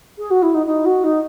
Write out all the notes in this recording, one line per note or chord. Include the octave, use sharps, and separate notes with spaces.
G#4
F#4
E4
D#4
D#4
F#4
D#4